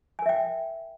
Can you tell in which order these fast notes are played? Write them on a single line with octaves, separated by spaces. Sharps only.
G#5 A#4 E5 G5